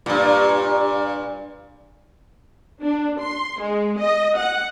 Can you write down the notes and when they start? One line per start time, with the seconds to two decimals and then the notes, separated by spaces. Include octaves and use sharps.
0.06 G2 A#2
2.82 D4
3.21 C6
3.60 G#3
3.99 D#5
4.37 F#5